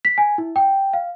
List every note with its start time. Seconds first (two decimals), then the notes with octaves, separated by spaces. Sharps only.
0.05 B6
0.18 G#5
0.38 E4
0.56 G5
0.93 F5